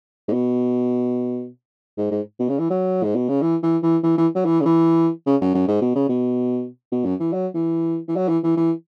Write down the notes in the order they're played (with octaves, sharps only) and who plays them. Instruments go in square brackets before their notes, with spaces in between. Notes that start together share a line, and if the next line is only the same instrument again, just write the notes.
[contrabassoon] G#2
B2
G#2
G#2
B2
C#3
E3
F#3
G#2
B2
C#3
E3
E3
E3
E3
E3
F#3
E3
C#3
E3
C#3
F#2
F#2
G#2
B2
C#3
B2
B2
F#2
E3
F#3
E3
E3
F#3
E3
E3
E3